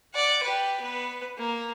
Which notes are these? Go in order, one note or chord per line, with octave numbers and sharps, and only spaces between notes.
D5 F#5
G4 B4
B3 B4
A#3